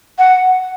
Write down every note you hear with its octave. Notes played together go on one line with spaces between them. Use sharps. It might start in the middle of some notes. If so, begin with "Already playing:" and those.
F#5